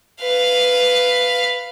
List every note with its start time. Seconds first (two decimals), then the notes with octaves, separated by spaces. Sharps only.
0.21 B4 F5